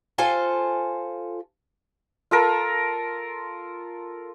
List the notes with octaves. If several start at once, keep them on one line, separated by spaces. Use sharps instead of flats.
F4 A4 C5 G#5
F4 A4 A#4